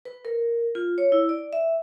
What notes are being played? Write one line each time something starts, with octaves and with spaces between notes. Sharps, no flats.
B4
A#4
F4
C#5
E4
D5
E5